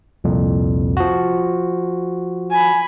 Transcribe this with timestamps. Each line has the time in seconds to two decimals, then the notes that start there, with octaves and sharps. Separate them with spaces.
0.24 C2 F2 A#2
0.97 F3 F#4
2.50 G#5 B5